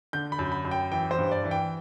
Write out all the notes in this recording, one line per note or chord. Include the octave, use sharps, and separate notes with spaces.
D3 G6
B5
F#2
B5
F#2
G5
E3 G5
C5
G2
D5
E3
G5